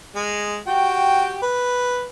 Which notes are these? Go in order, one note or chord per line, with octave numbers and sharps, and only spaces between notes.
G#3
F#4 G4 G5
B4